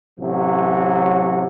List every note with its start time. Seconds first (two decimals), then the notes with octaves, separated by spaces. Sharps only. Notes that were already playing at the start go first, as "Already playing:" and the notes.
0.19 A1 C3 F#3